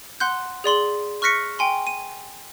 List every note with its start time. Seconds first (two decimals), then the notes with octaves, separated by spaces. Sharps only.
0.20 F#5 C6 F#6 G6
0.64 G#4 D5 C6 F#7
1.22 C#6 F6 F#6 A#6 B6 C#7
1.59 G5 G#5 C6
1.87 D#7